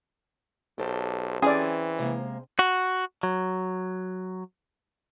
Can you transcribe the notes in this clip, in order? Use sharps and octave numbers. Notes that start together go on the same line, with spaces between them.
B1 G4 A4 C5
E3 C4 C#4 G#4 D5
C3 G#3 A#3
F#4
F#3